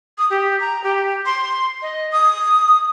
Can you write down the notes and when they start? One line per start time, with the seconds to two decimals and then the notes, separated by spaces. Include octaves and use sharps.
0.18 D#6
0.30 G4
0.60 A#5
0.84 G4
1.26 C6
1.82 D#5
2.12 D#6